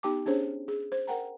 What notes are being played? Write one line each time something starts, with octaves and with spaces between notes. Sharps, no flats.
B3 D#4 G4 G5 A5 D6
C#4 D4 G#4 C5 C#5
G#4
C5
A#4 F#5 G5 A#5